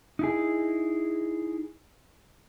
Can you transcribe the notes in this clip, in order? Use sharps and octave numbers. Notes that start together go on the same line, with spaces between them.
D#4 E4 G#4